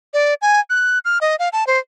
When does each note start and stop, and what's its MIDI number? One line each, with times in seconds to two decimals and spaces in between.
0.14 0.34 74
0.42 0.60 80
0.70 0.99 90
1.05 1.18 89
1.21 1.36 75
1.39 1.49 77
1.53 1.66 81
1.67 1.79 72